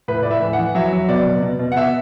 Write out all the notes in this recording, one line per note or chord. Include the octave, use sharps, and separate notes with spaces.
A2 B4
A2 D5
E5
E3
F#5
E3
F#3 E5
F#3
B2 D5
B2
B2
B2
F#5
B2 E5